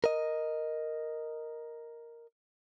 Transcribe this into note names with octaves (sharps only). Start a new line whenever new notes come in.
A#4 D#5